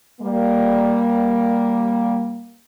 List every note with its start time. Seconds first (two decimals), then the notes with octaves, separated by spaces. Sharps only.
0.21 G3 A#3